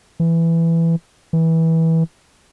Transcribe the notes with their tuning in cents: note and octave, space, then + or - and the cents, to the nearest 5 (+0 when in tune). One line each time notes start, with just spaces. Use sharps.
E3 +10
E3 -20